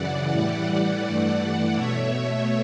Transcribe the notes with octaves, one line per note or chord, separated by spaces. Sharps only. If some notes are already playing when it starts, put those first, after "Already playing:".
Already playing: F#2 C#3 E3 D5 F#5
A2 E3 G3
G2 E3 A3
B2 A3 C#5 E5